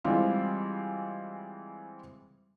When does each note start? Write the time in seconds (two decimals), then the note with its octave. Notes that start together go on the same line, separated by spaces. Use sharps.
0.04 E3 G3 G#3 C4 F4